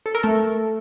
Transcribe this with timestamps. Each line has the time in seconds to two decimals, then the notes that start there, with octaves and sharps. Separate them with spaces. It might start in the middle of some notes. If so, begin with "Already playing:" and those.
0.06 A4
0.15 A#4
0.23 A3 A4